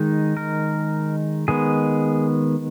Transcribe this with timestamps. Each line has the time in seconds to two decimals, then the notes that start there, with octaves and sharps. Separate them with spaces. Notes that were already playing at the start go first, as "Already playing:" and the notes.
Already playing: D#3 G#3 D#4
0.37 A#4
1.48 D#3 G#3 B3 G#4